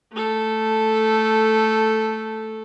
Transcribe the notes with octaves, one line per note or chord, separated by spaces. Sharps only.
A3 A4